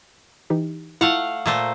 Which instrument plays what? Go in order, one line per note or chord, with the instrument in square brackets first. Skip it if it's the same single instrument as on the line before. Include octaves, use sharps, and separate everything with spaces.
[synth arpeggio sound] E3 D#4 G4
[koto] A3 F5 F#5 [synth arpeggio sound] E4 F4
[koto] A#2 A3 C5 [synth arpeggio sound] D6 B6